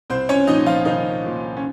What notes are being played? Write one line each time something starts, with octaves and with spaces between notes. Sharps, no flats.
C2 C4 C5
C#4 C#5
A#2 F3 D#4 D#5
F3 F4
C2 D#3 D#4
A#2 F3
C#4